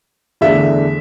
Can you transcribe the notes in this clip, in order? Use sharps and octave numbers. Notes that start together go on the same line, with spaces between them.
E2 D3 A3 D4 E5